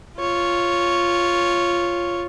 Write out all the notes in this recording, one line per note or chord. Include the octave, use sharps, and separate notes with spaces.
F4 C#5